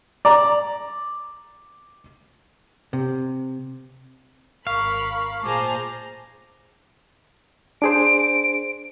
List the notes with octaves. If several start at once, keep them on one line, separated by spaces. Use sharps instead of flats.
D5 A#5
C3
G#1 A#4 F5 B5 C#6
A#2 G#4 C5 A5 A#5 D6
D4 G#4 C5 D7